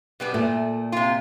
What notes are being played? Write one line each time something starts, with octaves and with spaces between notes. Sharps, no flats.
B2 G3 B3
A#2 A3
C3 F4